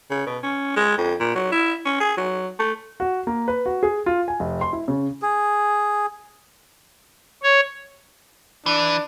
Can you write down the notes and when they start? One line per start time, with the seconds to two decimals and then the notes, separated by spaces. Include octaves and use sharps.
0.10 C#3
0.27 B2
0.43 C#4
0.77 G#3
0.98 F2
1.20 A#2
1.35 F#3
1.52 E4
1.85 C#4
2.01 G#4
2.17 F#3
2.59 A3
3.00 F#4
3.27 A#3
3.48 B4
3.66 F#4
3.83 G#4
4.06 F4
4.28 G#5
4.40 F1
4.61 C6
4.73 E4
4.88 C#3
5.22 G#4
7.43 C#5
8.66 E3 D4